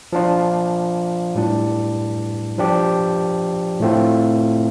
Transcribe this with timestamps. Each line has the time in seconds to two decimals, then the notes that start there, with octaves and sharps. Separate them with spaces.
0.13 F3 D4 F4
1.35 A2 G3 D4
2.58 F3 D4 G4
3.80 A2 A3 C4 F4